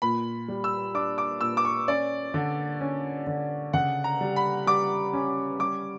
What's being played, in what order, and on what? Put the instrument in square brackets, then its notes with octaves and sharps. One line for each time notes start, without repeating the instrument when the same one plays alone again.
[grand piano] A#2 B5
G3
E6
D4 D6
D6
A#2 E6
D6
C#6
C#4 D5
D3
C#4
D3
C#3 F#5
A#5
G3
B5
G3 D6
C#4
G3 D6